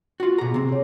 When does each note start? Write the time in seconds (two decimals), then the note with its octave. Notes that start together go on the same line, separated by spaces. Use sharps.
0.20 F4 F#4
0.38 B2 G#4 A#5
0.54 C3 C4
0.69 G#4 C#5